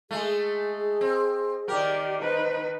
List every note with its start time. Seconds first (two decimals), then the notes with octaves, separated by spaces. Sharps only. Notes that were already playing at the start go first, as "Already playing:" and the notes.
0.11 G#3 A3 G#4
1.01 C4
1.68 D#3 G4 A#4 D5
2.21 D#4 B4 C5